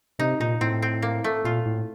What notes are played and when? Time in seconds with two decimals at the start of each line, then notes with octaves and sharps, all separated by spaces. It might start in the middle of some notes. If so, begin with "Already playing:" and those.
0.19 C3 D#4
0.40 A#2 D#4
0.61 A2 C4
0.82 C4
1.02 A#3
1.24 A3
1.44 A#2 F4
1.66 A2